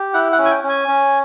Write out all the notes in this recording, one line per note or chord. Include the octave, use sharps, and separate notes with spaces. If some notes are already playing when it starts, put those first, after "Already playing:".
Already playing: G4
E4 F#5
F#5
C#4
G#5
G5
C#4
G#5
C#4